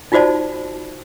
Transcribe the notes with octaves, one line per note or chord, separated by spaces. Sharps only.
D#4 F4 F#4 C5 D5 A5